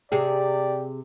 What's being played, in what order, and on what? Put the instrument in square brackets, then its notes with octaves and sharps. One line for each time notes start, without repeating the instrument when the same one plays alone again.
[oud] C3 G#4 [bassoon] G4 [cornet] D5